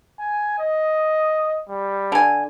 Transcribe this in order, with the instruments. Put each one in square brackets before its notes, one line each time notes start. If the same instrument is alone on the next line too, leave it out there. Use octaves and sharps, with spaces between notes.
[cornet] G#5
D#5
G3
[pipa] D3 G#5